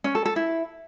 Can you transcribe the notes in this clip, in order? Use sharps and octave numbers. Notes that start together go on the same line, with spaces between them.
C#4
A4
A4
E4